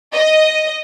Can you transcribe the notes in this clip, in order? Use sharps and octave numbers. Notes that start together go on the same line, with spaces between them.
D#5